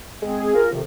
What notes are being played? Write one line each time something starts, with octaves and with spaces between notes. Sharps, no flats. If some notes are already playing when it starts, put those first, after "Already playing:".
G#3 C4 G#4
F4 A#4
F2 C3 D#3